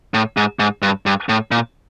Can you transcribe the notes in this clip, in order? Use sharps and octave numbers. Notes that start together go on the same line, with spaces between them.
A2
G#2
G#2
G2
G2
A2
A#2